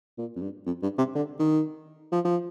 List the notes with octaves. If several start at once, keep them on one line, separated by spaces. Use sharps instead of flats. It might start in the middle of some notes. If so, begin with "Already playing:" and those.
A#2
F2
G2
F2
G2
C3
D3
D#3
F3
F3